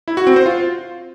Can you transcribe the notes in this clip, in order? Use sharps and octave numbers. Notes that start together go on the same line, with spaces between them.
E4
F#4
C4
C5
F4